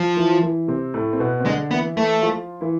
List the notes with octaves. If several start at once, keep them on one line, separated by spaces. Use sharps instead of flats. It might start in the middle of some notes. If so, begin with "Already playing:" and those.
Already playing: F3
E3 E4
E3 E4
C3 C4
A2 A3
C4
B2 B3
C4
D3 G#3 D4
E3 B3 E4
E3 A3 E4
F3 F4
E3 E4